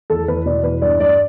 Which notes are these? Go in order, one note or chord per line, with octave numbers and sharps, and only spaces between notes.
E2 A4
E2 B4
B2 D5
E2 B4
G2 D5
G2 D5